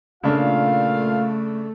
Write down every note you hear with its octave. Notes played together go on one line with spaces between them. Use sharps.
A#2 C#3 A3 D4 F4 F5